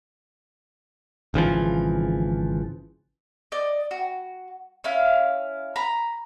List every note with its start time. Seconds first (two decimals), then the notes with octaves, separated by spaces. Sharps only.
1.34 G#1 C#3 E3 F3
3.52 D5 D#5
3.91 F#4
4.84 C#4 E4 F5
5.76 A#5 B5